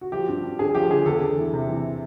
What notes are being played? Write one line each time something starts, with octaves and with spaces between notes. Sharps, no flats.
F#4
F3 G4
G2
G2
G2 G#4
F3 G4
D3 G#4
E2 A4
E2
E3
C3
E3